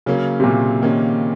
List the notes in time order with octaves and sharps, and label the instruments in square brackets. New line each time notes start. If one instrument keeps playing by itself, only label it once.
[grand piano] C#3 [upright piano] F#3 A#3 C#4
[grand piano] C3
A#2
[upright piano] D#3 A#3 C#4